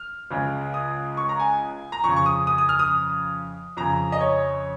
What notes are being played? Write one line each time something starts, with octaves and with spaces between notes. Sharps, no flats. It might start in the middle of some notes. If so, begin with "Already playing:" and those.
Already playing: F6
C#2 C#3
D#6
C#6
A#5
G#5
A#5
F2 C#3 C#6
C#6
D#6
D#6
D#6
F6
D#6
F2 C#3 A#5
D#5
C#5